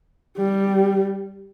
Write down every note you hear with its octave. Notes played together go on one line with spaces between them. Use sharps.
G3